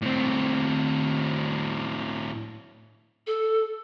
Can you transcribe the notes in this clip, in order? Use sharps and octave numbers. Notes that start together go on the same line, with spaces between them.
A2 C4
A4